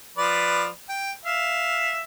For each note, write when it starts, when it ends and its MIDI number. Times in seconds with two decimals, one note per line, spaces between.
0.17 0.67 53
0.17 0.67 71
0.17 0.67 74
0.89 1.11 79
1.25 2.00 76
1.25 2.00 77